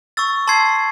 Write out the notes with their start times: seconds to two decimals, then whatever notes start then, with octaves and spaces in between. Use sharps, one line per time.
0.17 C#6 E6 A6
0.47 A5 C6 E6 G#6 C7